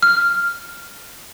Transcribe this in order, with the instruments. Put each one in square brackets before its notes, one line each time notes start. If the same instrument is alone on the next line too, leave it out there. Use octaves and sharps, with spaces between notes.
[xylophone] F6